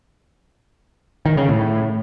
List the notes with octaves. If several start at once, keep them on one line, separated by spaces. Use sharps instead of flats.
D#3
C#3
A2